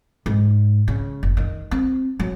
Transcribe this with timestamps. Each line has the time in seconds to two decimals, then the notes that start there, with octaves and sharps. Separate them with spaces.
0.26 G#2
0.88 C#3
1.23 F#1
1.37 D#3
1.71 C4
2.20 F#3